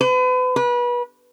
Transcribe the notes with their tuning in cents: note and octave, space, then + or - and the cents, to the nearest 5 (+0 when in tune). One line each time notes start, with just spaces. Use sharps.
B4 +40
B4 -30